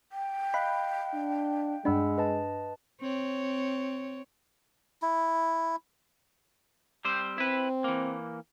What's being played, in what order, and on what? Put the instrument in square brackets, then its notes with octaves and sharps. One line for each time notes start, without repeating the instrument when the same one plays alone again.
[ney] G5
[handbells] D#5 F5 F#6 [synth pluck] B5
[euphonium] D4
[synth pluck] G2 D4 [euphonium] G#3 [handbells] F#5 B5 E6
[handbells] B4 D#5 A5
[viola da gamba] C4 C#5
[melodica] E4
[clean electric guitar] G3 C4 C5
[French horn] C4 [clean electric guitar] E4 B4
[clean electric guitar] E3 A#3